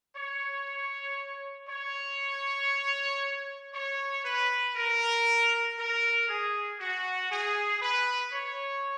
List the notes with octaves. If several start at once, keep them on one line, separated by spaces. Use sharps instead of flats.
C#5
C#5
C#5
B4
A#4
A#4
G#4
F#4
G#4
B4
C#5